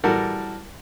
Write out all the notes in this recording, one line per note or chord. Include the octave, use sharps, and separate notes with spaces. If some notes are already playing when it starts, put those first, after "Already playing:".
E3 G3 F#4 A4 A#4